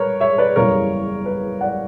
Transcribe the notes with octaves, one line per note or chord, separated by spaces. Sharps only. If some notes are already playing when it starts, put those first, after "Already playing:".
Already playing: G3 A#4 B4 C#5
C#5 E5
B4 D5
F#1 E2 C#3 G3 A#4 C#5
B4
D5 F#5